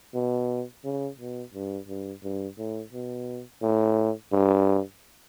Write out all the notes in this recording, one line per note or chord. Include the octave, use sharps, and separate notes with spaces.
B2
C#3
B2
G2
G2
G2
A2
B2
A2
G2